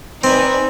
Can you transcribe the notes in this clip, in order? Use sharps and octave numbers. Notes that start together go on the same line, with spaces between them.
C4 D#4 B4 D5 G#5